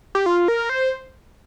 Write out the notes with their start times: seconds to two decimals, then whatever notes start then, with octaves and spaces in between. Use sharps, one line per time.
0.15 G4
0.26 F4
0.48 A#4
0.69 C5